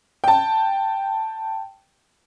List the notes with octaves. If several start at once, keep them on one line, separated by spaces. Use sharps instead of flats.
G5 A5